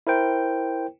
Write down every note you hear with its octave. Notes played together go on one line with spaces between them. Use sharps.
E4 A#4 C5 G5